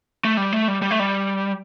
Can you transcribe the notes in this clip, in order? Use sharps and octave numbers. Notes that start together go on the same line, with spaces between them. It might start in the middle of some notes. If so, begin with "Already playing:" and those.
A3
G3
A3
G3
G3
A3
G3